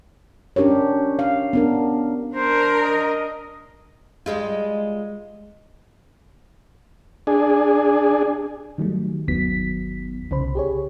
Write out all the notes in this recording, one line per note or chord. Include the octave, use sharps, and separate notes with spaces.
C#4 D4 G4 A#4 C#5
F5
B3 D4 A#4
D4 A#4 C5
D#5
G3 G#3 F4
D4 G#4
D#3 F#3 G3 A3
G1 D#2 D#3 F#3 B3 B6
C2 C#3 C5 B5
G4 G#4 C#5